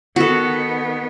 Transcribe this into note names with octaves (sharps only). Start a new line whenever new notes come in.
D#3 B3 F#4 A4